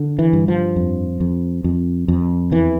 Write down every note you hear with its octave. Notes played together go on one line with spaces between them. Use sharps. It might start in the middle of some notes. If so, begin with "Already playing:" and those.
Already playing: D3
E3
G2
F3
F2
F2
F2
F2
E2 E3